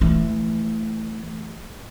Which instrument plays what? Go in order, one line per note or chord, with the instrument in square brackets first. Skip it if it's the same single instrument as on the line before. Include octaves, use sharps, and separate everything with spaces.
[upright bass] E3 A3